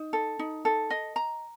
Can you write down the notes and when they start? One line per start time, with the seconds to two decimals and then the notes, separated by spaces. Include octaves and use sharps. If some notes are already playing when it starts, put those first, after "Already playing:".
Already playing: D#4
0.13 A4
0.39 D#4
0.65 A4
0.90 D#5
1.16 A#5